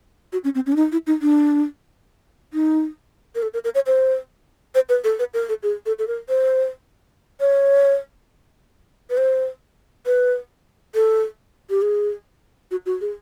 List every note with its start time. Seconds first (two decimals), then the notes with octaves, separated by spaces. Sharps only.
0.33 F#4
0.44 C#4
0.55 C4
0.66 C#4
0.72 D4
0.76 D#4
0.92 E4
1.07 D#4
1.22 D4
2.53 D#4
3.35 A#4
3.43 A4
3.54 A#4
3.64 A#4
3.75 C#5
3.87 C5
4.75 C5
4.89 B4
5.04 A4
5.19 B4
5.34 A#4
5.49 A4
5.63 G#4
5.86 A4
5.99 A4
6.07 A#4
6.29 C5
7.40 C#5
9.10 B4
9.17 C5
10.06 B4
10.95 A4
11.70 G4
11.82 G#4
12.71 F#4
12.86 F#4
13.01 G#4